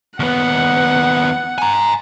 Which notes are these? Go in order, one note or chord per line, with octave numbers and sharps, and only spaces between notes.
D#2 B3 F#5
G#5 A#5